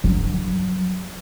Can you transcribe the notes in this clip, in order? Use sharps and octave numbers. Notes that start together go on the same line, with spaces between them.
G2 F#3